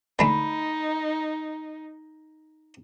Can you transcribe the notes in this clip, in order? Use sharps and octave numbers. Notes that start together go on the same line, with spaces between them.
D3 G#3 A3 D#4 B5